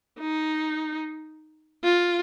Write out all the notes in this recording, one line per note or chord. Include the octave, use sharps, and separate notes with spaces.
D#4
F4